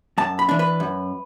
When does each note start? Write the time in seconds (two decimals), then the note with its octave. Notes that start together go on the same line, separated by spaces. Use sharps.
0.18 F#2 A5
0.39 B5
0.49 E3 D4
0.59 B4
0.80 F#2